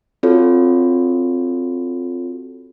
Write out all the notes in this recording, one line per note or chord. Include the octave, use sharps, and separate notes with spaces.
C4 F4 F#4 A4 C#5